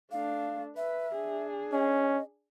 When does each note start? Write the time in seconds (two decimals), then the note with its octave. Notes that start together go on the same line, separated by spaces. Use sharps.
0.12 A3 D4 F5
0.77 B4 E5
1.14 D4 G#4
1.72 C#4 D#5